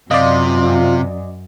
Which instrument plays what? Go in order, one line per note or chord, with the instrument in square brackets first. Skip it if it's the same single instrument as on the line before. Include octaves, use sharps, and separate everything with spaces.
[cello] F#2 [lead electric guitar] C3 [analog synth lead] F4 [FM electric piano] D5 D#5